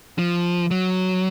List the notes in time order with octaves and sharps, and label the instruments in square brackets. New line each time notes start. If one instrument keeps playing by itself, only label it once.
[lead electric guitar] F3
F#3